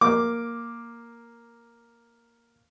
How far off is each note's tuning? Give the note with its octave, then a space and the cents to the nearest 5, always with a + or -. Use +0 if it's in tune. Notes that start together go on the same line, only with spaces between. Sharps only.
A#3 +0 D6 +0